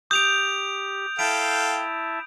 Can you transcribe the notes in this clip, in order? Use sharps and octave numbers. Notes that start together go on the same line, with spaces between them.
G4 D#6 G6 D7 F7
E4 A4 E5 F5 G5 A5 D7